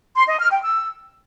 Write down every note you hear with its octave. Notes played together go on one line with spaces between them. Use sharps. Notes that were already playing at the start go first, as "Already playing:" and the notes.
C6
D#5
F6
G5
E6